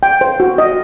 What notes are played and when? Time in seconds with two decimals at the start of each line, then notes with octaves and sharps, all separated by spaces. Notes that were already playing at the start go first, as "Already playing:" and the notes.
0.03 G5
0.21 C5
0.40 F#4
0.58 D#5